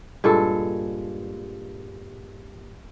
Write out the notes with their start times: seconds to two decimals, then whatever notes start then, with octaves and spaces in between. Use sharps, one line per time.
0.24 G2 A#2 G#3 A4